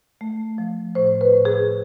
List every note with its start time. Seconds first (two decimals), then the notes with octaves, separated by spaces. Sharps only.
0.21 A3
0.58 F3
0.95 A2 C5
1.21 B4
1.33 A2
1.45 G#4